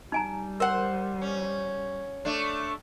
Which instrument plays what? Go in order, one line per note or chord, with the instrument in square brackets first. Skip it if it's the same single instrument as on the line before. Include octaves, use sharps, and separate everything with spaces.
[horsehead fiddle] G3 [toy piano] D#4 G#5 A#5
[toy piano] A#4 [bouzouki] C5 F#5
[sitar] C#4
A3 D4